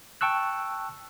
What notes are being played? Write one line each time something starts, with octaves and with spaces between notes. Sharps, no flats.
G5 A5 C#6 E6 F#6